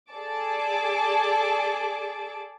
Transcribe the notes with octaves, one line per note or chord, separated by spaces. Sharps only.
G#4 A4 D5 A5 D6